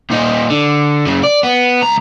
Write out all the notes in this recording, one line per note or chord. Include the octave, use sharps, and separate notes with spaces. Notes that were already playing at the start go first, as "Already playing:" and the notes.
A#2 D#4
D3
F#2 C#3
D5
B3
C#2 A#5